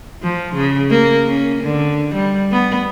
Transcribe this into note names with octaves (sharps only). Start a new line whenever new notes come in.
F3
C#3
A#3
C#4
D3
G3
B3